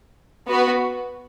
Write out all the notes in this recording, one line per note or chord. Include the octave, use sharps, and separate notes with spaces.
B3 F#4 B4